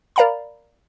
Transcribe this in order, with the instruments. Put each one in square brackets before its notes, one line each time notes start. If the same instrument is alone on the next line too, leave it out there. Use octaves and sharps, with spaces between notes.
[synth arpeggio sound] A#4 D5 F5 A#5 B5